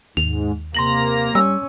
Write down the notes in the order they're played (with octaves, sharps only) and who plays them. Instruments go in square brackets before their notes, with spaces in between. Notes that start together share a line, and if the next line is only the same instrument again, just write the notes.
[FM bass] D#2 [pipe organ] G#2 [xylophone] F7
[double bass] C3 [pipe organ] A#3 A#5 [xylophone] C6 A#6 F#7
[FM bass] G3 [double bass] C#4 [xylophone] E6